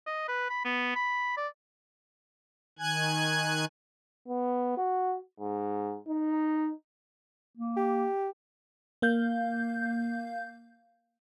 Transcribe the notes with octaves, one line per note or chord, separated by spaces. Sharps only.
D#5
B4
B5
B3
B5
D5
D#3 G#5 F#6 G#6
B3
F#4
G#2
D#4
A#3
G4
A#3 F5 G6